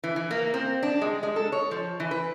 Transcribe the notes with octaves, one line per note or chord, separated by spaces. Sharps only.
E3
E3
A#3
C4
D4
G#3
G#3
A4
C#5
F3
E3
B4